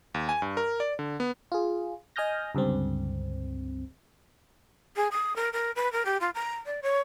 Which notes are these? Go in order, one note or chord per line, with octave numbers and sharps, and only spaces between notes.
D#2
G#5
G2
A#4
D5
D3
B3
F4 G#4
D#5 G#5 D#6 F6 G6 A#6
C#2 G2 D3 C4
G#4
D#6
A#4
A#4
B4
A#4
G4
F4
A#5
D5
C#5